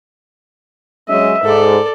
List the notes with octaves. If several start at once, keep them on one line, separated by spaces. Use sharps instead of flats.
F#3 G#3 C#4 D#5 E5
G#2 A4 D5